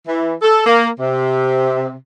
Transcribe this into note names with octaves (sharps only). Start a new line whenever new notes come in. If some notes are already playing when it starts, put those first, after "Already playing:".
E3
A4
A#3
C3